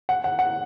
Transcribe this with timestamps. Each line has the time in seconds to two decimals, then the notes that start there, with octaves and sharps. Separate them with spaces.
0.09 F#5
0.24 F#5
0.39 F#5